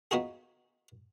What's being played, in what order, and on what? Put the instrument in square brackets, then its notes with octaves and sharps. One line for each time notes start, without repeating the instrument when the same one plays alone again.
[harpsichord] B3 D#4 F4 F#4 G#4